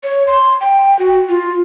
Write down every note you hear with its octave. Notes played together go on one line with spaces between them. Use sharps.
C#5
C6
G5
F#4
F4